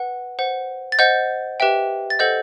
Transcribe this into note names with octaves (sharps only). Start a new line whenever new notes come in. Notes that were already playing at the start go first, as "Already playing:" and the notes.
Already playing: B4 F#5
C5 F#5
A6
C5 D#5 F#5 G6
G4 B4 E5 G5
A6
A4 C5 D#5 F#5 G6